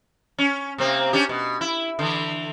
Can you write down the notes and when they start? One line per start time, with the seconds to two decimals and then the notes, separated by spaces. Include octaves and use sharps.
0.38 C#4
0.78 C3 A#3 C4
1.13 C#4 D4 G4
1.29 B2
1.61 E4
1.99 D3 E3